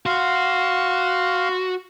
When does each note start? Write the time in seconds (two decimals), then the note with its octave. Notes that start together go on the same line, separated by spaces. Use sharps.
0.06 F#4 F5 C6